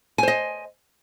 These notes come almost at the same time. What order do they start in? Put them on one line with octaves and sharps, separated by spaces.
G#5 C5 D#5